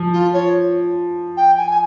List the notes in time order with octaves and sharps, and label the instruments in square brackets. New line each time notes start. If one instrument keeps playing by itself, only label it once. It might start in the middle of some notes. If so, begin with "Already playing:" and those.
Already playing: [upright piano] F3
[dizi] F4
C#5
G5
G#5
G#5